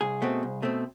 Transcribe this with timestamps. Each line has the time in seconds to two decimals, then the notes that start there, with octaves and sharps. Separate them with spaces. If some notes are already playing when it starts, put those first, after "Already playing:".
0.01 C2 G#4
0.22 B2 A3 C4
0.43 C2
0.62 B2 A3 C4